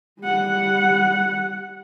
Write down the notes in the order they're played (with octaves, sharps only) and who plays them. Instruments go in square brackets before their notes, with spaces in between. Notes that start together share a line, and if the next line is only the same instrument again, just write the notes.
[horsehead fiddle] G3 F#5